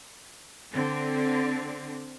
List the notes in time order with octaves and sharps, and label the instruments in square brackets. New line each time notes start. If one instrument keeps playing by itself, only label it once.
[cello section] D3 C4